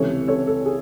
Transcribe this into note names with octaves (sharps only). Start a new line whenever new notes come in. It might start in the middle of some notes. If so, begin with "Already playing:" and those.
Already playing: C#2 C3 E3 A4 C#5
A4 C#5
A4
G#4